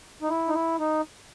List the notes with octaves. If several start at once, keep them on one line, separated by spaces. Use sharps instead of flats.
D#4
E4
D#4
E4
D#4